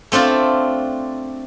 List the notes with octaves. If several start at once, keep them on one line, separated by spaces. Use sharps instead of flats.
A3 C4 D4 F4